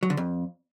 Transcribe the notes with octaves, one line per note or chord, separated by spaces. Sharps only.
F#3
D3
F2